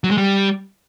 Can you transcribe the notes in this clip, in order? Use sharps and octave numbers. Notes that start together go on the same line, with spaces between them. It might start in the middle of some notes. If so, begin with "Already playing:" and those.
F#3
G#3
G3